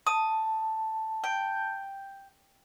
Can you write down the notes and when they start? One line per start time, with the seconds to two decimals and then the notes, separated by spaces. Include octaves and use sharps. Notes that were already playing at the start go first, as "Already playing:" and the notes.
0.07 A5 D#6
1.24 G5